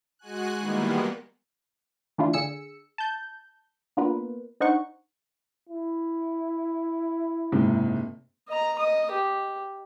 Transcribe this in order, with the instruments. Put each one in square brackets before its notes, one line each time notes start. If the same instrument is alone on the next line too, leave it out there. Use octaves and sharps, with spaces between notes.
[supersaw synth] G#3 F#4 G#5 F#6
D#3 E3 G3 G#3 A#3 B3
[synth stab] E3 A3 D4 E4 F4
D3 G#4 E6 C#7
A5 G6
A#3 B3 D4 F4 A#4 B4
D4 D#4 C5 F#5 C#6
[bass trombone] E4
[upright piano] F#1 G#2 C3
[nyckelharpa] D#5 A#5
D#5 D#6
G4